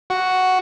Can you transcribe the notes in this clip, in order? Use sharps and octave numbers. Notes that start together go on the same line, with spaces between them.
F#4